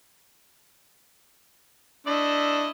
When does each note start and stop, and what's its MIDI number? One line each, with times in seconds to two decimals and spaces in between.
2.07 2.69 57
2.07 2.69 62
2.07 2.69 64
2.07 2.69 75